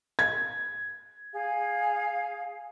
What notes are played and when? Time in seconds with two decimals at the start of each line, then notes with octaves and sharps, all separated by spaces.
0.19 G#6
1.32 G#4 F5